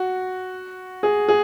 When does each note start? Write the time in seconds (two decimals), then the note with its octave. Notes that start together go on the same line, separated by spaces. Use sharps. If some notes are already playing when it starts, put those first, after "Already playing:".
Already playing: F#4
1.03 G#4
1.28 G#4